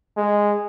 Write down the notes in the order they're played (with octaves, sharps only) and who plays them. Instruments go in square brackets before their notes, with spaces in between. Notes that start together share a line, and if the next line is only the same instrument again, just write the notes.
[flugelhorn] G#3